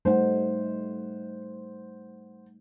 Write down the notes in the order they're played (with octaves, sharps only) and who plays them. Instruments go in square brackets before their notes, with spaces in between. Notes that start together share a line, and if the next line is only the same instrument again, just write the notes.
[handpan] G3 A3 D#4 [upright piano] C5 F#5